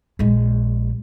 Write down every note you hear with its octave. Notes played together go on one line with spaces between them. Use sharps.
A#1 G#3